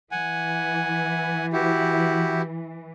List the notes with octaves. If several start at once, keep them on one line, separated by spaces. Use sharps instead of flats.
E3 F#5 G#5
E4 F#4 G4